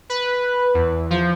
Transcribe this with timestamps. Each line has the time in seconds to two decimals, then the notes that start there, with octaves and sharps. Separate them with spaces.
0.10 B4
0.74 E2
1.11 F3